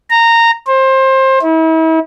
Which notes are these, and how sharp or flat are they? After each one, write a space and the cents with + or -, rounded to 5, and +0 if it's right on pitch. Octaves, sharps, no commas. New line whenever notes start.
A#5 -15
C5 +25
E4 -40